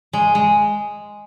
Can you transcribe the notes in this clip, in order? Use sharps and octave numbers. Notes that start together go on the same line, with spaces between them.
G#3
G#3